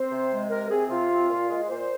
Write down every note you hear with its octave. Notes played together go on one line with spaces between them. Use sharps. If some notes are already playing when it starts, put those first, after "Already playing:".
Already playing: C4 C5
C3
G#3
C3 A#4
C4 G#4
C3 F4
C4
A#2
G#3
A#2 C5